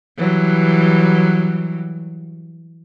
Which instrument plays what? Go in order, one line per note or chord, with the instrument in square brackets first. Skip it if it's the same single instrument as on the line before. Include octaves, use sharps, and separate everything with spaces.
[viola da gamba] E3 F#3 G3